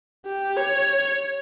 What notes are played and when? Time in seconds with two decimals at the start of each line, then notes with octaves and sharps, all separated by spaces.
0.26 G4
0.57 C#5